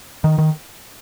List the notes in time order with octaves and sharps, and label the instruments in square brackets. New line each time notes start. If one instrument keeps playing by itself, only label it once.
[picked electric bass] D#3
D#3